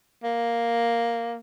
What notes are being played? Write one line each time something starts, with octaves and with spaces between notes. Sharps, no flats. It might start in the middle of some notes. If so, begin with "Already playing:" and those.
A#3